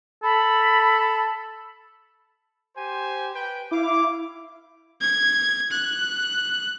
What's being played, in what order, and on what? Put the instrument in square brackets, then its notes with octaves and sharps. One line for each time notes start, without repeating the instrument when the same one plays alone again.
[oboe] A4 [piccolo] B5
[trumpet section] G4 C5 G#5
B4 G5
[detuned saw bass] E4 [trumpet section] F5 D6
[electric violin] G#6
F#6